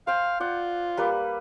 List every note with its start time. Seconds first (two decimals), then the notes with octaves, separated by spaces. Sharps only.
0.07 C5 F5 G5
0.40 F4 D5 F#5
0.97 G3 A#3 B4